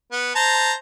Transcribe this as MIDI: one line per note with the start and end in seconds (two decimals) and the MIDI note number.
0.12 0.34 59
0.35 0.73 72
0.35 0.73 81
0.35 0.73 82